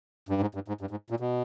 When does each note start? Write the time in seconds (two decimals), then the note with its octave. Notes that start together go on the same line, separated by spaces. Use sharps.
0.29 G2
0.41 G#2
0.55 G2
0.68 G#2
0.81 G2
0.91 G#2
1.10 A#2
1.20 B2